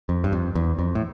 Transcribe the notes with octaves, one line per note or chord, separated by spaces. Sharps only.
F2
G2
F2
E2
F2
A2